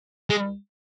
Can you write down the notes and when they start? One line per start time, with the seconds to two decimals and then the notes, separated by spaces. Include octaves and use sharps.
0.30 G#3